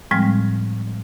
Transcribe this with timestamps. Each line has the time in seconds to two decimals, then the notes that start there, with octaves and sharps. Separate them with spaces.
0.11 A2 F3 G3 G#3 C4 F6